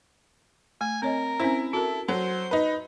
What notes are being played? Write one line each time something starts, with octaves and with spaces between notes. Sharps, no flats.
A3 G#5
C4 A#4 C#5 D#5
C4 C#4 E4 C5
F#4 A4 A#4
F#3 A4 C5
D#4 B4